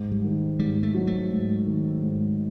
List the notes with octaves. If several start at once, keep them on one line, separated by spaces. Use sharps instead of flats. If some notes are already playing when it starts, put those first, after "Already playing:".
Already playing: G#2
G3
D#3
G#2 G3
A3
F#3
A3
G#2
D#3
G#2